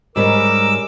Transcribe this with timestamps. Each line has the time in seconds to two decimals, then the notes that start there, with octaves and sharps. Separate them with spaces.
0.16 G#2 G3 C#4 A#4 D6 E6